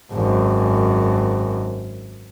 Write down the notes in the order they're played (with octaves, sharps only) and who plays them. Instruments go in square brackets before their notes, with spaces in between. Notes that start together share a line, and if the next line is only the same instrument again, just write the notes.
[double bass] G#1 F#2